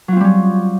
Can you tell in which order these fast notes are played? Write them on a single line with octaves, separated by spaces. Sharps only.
F#3 F4 C4 G3 C#4